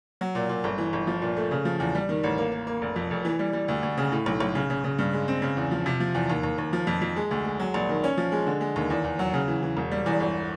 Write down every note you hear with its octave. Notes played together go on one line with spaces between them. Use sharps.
F#3
A#2
A#2
G1
E3
G1
F3
A#2
A3
C#3
F3
E2
G3
D#3
A1
A#3
A#3
A#3
F1
F2
F1
E3
G3
G3
D2
D2
C#3
A2
B1
B1
C#3
C#3
C#3
G2
G#3
C4
C#3
E2
F3
C3
F3
E2
D#2
D#2
D#2
F3
F2
F2
G#3
D2
G#3
F#3
A#1
D#3
C#4
F3
G#3
D3
G#3
D#2
E2
E2
F#3
C#3
E3
E3
E1
G3
E2
G1